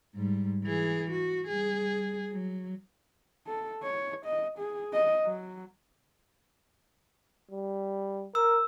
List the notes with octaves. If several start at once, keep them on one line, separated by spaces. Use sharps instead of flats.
G#2 G3
E3 G#4
F#4
G3 G#4
F#3
A4
C#5
D#5
G#4
D#5
F#3
G3
A#4 E6